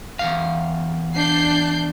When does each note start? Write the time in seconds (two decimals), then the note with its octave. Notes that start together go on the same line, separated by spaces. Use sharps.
0.19 E2 G#2 F5
1.16 D4 G6 C7